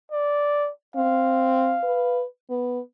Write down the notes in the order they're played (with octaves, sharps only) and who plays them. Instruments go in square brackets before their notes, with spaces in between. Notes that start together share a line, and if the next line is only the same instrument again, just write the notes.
[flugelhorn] D5
[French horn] C4 [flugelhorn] F5
[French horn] B4
B3